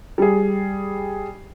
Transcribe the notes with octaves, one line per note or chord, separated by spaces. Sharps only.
G3 G#4